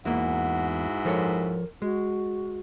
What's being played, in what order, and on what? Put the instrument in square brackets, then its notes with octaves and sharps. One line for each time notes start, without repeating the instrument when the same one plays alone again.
[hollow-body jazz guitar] E2 A#3 [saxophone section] G#2 E4 F#4 [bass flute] F#5
[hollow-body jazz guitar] F3 A4 C#5 [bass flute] A#4
[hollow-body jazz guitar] G#3 [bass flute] F#4